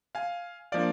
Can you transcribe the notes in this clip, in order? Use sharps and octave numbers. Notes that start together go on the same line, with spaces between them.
F5 G#5
F3 A#3 D4 D5 F5